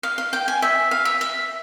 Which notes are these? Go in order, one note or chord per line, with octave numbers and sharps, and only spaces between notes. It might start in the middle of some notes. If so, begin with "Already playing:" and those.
F5
F5
G5
G#5
E5
F5
E5
E5